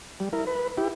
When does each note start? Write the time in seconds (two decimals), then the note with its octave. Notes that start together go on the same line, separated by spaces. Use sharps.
0.20 G3
0.33 E4 A#4
0.47 B4
0.77 E4 G4